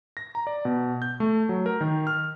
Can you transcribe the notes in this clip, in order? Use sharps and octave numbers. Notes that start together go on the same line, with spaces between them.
A#6
A#5
D5
B2
G6
A3
F#3
A#4
D#3
F6